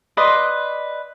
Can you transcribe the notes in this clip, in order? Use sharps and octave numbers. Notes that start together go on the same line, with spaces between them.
B4 D5 D#5 C6